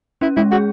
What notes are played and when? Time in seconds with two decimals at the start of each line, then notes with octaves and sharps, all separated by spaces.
0.21 C#4 E4
0.36 G#3 E4
0.51 F#4 G#4